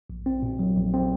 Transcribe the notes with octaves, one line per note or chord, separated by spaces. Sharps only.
A#1
C4
A#2
F#3
A#1
C4